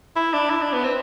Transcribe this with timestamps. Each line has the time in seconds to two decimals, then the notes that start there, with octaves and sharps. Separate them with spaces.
0.16 E4
0.33 D4
0.50 E4
0.62 D4
0.73 B3
0.84 C4